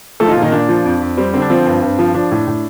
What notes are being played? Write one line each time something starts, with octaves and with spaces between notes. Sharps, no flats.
F3 A3 A4
D#4
F3 F4
A#2
D#3 D#4
A#2 D4
F3
F2
F2
G3 C4
D3 C4
D4
F3 C4
G2
G2
F3
F3 D4
A2
A2